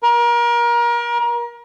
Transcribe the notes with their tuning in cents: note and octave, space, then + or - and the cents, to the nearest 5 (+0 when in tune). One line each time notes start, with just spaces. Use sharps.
A#4 +30